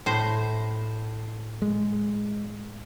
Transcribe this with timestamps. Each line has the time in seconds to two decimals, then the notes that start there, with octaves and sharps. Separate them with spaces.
0.06 A2 C5
1.62 G#3